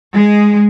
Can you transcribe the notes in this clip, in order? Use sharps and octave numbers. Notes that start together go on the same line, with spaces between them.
G#3